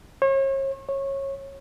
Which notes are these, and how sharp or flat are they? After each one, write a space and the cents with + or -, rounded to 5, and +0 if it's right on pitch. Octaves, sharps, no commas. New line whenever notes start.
C#5 -40
C#5 -20